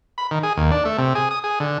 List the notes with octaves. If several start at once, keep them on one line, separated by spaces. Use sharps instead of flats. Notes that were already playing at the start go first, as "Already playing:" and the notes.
B5
D#3
G#4
D#2
D4
A3
C3
G#4
D#6
G#4
D3